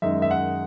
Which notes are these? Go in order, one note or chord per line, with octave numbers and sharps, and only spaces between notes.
F#2 D#3 G#3 D#4 E5
E5
F#5